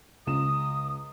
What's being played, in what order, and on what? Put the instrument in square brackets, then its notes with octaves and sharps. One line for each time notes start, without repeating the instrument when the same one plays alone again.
[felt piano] C#2 E7 [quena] D#6